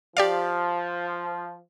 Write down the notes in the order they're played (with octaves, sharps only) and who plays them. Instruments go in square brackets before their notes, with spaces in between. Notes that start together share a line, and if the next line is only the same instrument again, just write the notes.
[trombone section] F3 [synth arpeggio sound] G4 D5 F5